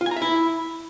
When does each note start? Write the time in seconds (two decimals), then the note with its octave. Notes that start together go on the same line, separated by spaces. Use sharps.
0.01 F4
0.06 G#5
0.11 A#5
0.16 E5
0.22 E4